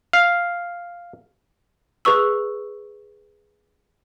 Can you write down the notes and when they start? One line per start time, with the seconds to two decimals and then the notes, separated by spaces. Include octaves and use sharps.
0.13 F5
2.05 G#4 B4 C#6 E6